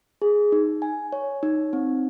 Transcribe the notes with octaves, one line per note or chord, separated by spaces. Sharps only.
G#4
D#4
G#5
C#5
D#4
C4